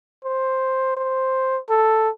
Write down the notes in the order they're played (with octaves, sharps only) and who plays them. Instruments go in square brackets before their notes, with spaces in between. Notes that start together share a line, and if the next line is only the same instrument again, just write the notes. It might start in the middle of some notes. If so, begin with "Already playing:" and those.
[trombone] C5
C5
A4